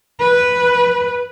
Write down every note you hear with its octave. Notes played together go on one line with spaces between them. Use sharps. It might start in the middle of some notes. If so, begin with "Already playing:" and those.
B4